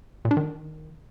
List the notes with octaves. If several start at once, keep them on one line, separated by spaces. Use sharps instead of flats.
A#2
D4
D#3